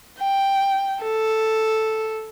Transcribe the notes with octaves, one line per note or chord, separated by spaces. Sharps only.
G5
A4